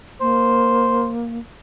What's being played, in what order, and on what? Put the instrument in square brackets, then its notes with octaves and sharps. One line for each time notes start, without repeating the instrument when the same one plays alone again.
[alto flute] A#3 [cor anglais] C5